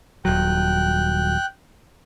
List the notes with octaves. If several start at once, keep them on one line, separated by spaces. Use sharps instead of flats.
D#1 F#3 G5 F#6